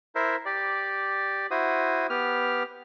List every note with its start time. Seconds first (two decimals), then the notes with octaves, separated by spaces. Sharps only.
0.15 E4 A#4 C5 E5
0.46 G4 D5
1.51 E4 F#4 C5 D#6
2.10 B3 G4 F6